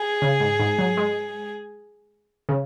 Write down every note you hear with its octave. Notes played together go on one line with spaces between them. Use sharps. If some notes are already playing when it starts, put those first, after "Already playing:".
Already playing: G#4
C#3
G#2
G#2
F#3
G#3
C#3